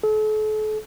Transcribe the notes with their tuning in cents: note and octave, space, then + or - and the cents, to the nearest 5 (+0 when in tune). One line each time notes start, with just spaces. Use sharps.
A4 -40